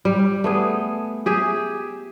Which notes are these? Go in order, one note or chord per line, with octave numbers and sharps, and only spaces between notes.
G3
A3 B3 G#4
G4 G#4 E5